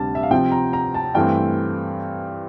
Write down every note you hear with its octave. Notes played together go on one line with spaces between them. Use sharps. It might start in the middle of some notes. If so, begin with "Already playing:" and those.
Already playing: D2 C3 G3 D4 A5
E5
F5
C3 F3 C4 G5
A#5
A#5
A5
G2 E3 A3 C4 G5